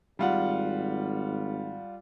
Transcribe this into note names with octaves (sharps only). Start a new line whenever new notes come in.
G#1 G3 F4 F#5